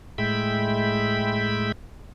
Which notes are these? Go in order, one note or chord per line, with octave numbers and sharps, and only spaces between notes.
A2 G#3 E5 G5 B5